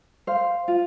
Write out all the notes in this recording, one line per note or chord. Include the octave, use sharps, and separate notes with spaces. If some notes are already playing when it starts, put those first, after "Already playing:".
C5 F5
F4